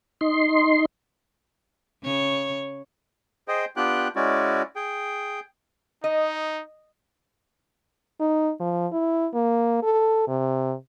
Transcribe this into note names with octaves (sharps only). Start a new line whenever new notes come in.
D#4 C6
C#3 C#5
G#4 C5 D#5 G5
B3 D4 F4 G4 G5 F#6
G#3 C#4 E4 F#4 D5
G#4 G5
D#4 D#5
D#4
F3
E4
A#3
A4
C3